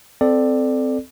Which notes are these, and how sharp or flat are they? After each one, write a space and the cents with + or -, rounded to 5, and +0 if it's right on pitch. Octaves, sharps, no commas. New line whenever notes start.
C4 -15 A4 -5 D5 +10